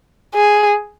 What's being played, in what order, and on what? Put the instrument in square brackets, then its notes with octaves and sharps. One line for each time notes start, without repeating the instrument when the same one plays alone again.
[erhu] G#4